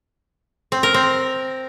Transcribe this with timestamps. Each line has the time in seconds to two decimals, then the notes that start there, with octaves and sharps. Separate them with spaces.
0.72 C4
0.83 A#4
0.94 C4